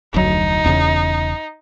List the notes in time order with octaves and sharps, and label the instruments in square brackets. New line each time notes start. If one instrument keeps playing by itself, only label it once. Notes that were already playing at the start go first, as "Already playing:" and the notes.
[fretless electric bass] F1 D2 F#3 [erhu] D#4
[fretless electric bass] E1 E2 C#3